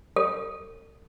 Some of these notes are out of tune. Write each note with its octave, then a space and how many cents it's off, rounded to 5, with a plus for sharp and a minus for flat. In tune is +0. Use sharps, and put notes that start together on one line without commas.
A4 +45